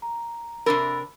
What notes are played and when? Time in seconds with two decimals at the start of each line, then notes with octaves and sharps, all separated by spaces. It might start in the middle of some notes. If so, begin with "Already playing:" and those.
0.02 A#5
0.66 C3 D4 A#4 B5 E6 A6